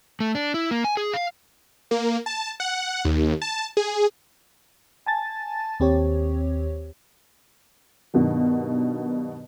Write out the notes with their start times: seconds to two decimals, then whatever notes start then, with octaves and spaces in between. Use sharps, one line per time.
0.20 A3
0.35 D4
0.54 E4
0.71 A#3
0.84 G#5
0.97 G#4
1.13 F5
1.91 A#3
2.26 A5
2.60 F#5
3.05 D#2
3.42 A5
3.77 G#4
5.06 G#5 A5 A6
5.80 D#2 C4 G4 C#5
8.14 G2 B2 D#3 F#3